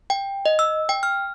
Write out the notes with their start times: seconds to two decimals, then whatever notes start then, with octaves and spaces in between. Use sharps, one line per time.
0.10 G5
0.46 D#5
0.59 E6
0.89 G5
1.03 F6